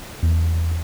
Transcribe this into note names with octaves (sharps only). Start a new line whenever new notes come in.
E2